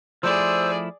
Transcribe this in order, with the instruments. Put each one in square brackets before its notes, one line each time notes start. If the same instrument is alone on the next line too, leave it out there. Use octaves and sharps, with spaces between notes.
[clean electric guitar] F3 A3 E4 [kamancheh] G#4 D5 [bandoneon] C5 E6